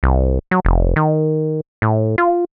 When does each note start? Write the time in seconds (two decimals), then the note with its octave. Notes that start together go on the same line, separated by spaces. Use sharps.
0.03 C2
0.51 F#3
0.65 F1
0.96 D#3
1.82 A2
2.18 F4